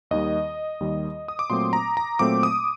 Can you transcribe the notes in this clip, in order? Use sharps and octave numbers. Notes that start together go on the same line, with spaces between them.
D#2 D#3 G3 D#5
D#2 D#3 G3
D#6
D6
A#2 F#3 A3 C4 C6
A#5
A#5
A#2 F#3 A3 C4 D6
D#6